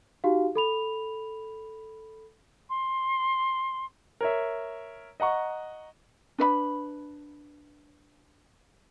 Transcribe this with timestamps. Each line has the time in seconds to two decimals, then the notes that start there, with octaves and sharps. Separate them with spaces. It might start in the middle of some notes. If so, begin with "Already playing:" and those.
0.24 D#4 F#4 G4 F5
0.55 A4 B5 F7
2.69 C6
4.21 A#4 C#5 E5
5.20 D#5 F#5 A#5 C#6
6.38 D4 B4 E5 B5